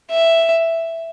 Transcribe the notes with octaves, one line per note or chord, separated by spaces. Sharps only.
E5